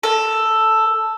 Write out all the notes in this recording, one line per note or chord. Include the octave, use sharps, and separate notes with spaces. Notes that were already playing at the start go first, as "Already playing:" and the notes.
A4